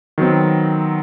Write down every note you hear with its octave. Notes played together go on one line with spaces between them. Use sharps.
D#3 F#3 B3 C4